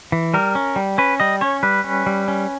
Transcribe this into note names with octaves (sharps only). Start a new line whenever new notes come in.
E3
G3 A#4
C#4
G3
C#4 B4
G3 D#5
C#4 C#5
G3 B4
C#4
G3
C#4